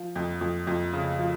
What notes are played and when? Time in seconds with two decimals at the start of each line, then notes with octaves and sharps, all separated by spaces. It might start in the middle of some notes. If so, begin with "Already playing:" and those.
Already playing: F3
0.16 F2
0.41 F2
0.67 F2
0.93 C#3
1.19 F3